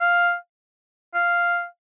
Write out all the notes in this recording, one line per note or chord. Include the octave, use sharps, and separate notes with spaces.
F5
F5